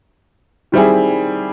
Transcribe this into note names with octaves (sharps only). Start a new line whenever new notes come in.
D#3 G3 C4 E4 G#4